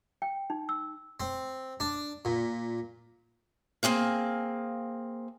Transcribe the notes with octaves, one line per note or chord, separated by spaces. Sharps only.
G5
D#4
E6
C4
D4
A#2
A#3 C4 G#4 F5